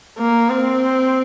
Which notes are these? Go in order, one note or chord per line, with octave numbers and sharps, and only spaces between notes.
A#3
C4